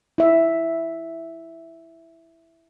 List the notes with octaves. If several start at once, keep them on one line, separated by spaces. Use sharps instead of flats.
E4 E5